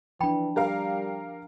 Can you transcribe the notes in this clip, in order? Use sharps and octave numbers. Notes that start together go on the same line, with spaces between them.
E3 F3 D4 G5 B5
G3 G4 A#4 F5